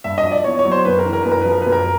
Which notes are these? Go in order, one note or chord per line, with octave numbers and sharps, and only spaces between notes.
G2 E5
D#5
F3
D5
E2 C#5
C#5
F#3
C5
F#2 B4
A#4
E3
A#4
F#2 B4
A#4
F3 B4
A#4
F#2 B4
A#4